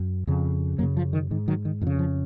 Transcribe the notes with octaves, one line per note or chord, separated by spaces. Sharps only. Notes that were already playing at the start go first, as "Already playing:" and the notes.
Already playing: F#2
F2 C#3
F#2 C#3 F#3 A#3
F3
D#3
G#2 D#3
D#3 F#3
D#3
F2 D#3
C#3
F3